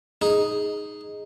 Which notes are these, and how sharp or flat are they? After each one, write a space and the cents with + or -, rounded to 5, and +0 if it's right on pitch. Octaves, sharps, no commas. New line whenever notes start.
D#4 +0 G#4 +0